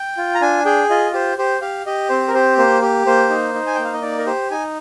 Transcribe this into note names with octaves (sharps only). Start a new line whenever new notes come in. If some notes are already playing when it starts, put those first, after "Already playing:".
Already playing: G5
F4
A#5
D4 G#5
G#4 G5
F4 D#5
G4 C5
G4 C5
G4 F5
G4 D#5
C4 C5
A#4
G4 C5
A#3 C5
G4
A#3 C5
D#4
D#4
G#5
A#3 G5
F5
D#5
D#4 D5
A#4
G4 C5
D#4 G#5